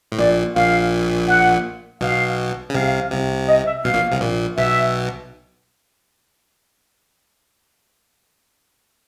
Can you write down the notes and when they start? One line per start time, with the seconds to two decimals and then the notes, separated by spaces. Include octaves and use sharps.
0.12 A2
0.18 A#1 A#2 D5
0.55 A#1 A#2 F5
1.28 F#5
2.01 B1 B2 F5
2.69 C#3
2.74 C2 C3 F5
3.11 C2 C3
3.48 D#5
3.66 E5
3.84 B1 B2 F5
3.93 A#1 A#2
4.11 C2 C3
4.21 A#1 A#2
4.57 B1 B2 E5